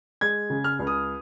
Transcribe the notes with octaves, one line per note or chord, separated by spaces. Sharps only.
G#3 G#6
C#3
F6
C#2
D#6